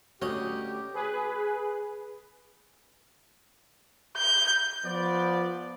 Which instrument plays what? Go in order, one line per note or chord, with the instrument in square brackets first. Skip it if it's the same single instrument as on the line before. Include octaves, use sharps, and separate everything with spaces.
[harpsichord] D2 D#5 D#6 [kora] C#4 [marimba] F#4 [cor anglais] G4
[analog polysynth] G#4 B4
[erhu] G6
[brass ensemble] F3 B3 D5